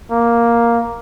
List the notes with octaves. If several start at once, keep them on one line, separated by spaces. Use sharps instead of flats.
A#3